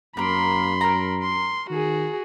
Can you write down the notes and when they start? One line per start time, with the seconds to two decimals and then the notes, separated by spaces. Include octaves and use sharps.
0.17 F#2 A#3 A#4 B5 C6
0.81 A#4 A#5
1.23 C6
1.70 D#3 F#4 G#4